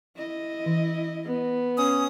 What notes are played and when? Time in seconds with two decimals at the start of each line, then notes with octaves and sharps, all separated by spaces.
0.16 E4 D#5
0.66 E3
1.25 B3
1.78 C#4 D#6